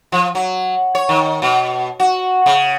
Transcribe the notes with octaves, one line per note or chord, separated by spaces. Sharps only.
F3
F#3
C#5
D#3
B2
F#4
C#3